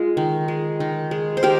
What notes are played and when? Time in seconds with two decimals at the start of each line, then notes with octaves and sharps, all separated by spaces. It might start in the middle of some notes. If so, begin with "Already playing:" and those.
Already playing: G#3 F4 G#4
0.17 D#3
0.48 G#3
0.80 D#3
1.11 G#3
1.37 C5
1.43 D#3 G4 A#4